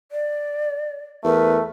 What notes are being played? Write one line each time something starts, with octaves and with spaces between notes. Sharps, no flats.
D5
E2 A3 A#4 B4